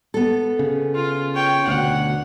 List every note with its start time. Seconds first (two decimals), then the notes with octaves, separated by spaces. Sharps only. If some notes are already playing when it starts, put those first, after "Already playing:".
0.14 B3 A4
0.59 C#3
0.95 F4
1.35 C#5 G5
1.68 D2 B2 F#5